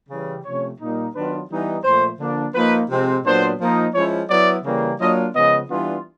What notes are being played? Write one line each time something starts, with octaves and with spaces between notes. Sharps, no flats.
C#3 E3 G3
C3 F3 A3 C#4 C#5
A#2 G3 A#3 D#4
D#3 F#3 B3 D4 F4 B4
E3 G3 B3 D#4
A#2 F3 A3 C5
D3 F3 A#3 D4
F3 A#3 D#4 B4
C3 F3 G#3 C4
A#2 F#3 B3 D4 C5
F3 A#3 D#4
F3 G#3 C#4 E4 C#5
F#3 B3 E4 D5
C#3 E3 G3 A#3
F#3 A#3 D4 F4 D#5
C#3 F3 G#3 B3 D#5
E3 G3 B3 D4 F4